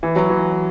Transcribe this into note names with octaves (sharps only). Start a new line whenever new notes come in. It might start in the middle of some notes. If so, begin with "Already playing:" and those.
E3
F#3
E3